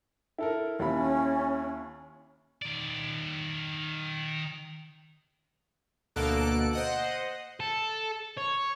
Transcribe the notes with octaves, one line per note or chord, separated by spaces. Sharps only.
E4 A4 A#4
D#2 C#4 E4 B5
D#3 D5
D2 B2 A#3 A4 F#6 D7
C5 D#5 F#5
A4
C#5